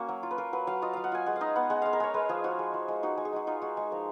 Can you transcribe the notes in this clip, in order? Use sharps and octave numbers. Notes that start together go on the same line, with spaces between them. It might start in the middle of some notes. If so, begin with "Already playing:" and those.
Already playing: A#3 C#4 F#4 A#4
F#3
F4
B4
F4 A#4
F#3 B4
F#3 F5
F4 D#5
F#3 F5
F#5
F4 G#5
G#3 F#5
F5
D#4 D#5
B3 F#5
G#3 F#5
G#3 F5
A#4
G#3 C#5
G#3 B4
F3 G#4
F3 F#4
G#3
F3
G#3
D#4 F#4
G#3
G#4
G#3 F#4
D#4 F4
G#3 F#4
G#3 G#4
F3 A#4